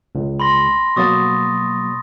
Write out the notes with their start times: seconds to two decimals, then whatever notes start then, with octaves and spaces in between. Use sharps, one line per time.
0.15 C#2
0.40 B5 C6 A#6
0.96 B2 F#3 A#3 C#6 D#6 A6